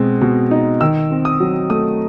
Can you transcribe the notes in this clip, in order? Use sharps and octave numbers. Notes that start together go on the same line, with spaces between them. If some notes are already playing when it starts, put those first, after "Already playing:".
Already playing: B2 G#3 C4
B2
D#4
D#3 E6
C4
D#6
F#3
A3 D#6